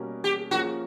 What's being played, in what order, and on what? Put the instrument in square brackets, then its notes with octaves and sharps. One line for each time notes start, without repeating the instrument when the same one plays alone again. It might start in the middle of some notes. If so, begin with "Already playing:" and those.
Already playing: [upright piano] B2 G3 A#3 C#4
[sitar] G4
[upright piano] F3 A#3 C#4 F4 G#4 [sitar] F#4